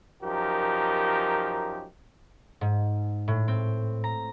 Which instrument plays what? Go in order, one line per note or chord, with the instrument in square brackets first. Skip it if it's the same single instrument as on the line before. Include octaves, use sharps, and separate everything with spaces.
[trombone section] F#2 F3 D#4 G4 A#4
[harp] G#2
A2
C4
A#5